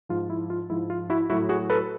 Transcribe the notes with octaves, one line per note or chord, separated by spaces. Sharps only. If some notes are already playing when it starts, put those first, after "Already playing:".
G#2 F3 F4
E4
F4
G#2 F3 E4
F4
E4 F#4
A2 F#3 E4 F#4
F#4 G#4
A4 B4